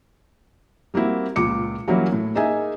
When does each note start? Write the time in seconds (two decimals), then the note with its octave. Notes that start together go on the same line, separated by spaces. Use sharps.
0.94 G3 A#3 C4 E4 F#4
1.36 C#2 A#2 D6 C#7
1.88 E3 F#3 G3 A#3 C#4 E4
2.12 A2
2.35 A#3 D#4 G#4 D#5 E5 G#5